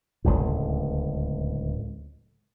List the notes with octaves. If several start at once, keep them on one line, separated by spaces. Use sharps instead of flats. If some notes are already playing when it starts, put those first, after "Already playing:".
D1 G1 C#2 A2